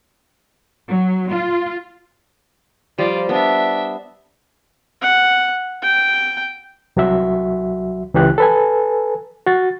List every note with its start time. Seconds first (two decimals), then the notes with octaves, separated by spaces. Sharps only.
0.88 F#3
1.31 F4
2.98 F3 G3 F4 D5
3.29 B3 D4 E5
5.02 F#5
5.82 G5
6.96 C2 F#3 F#4 E5
8.14 C#2 E3 G4 F#6
8.38 A4 B4 G#5
9.47 F#4 A6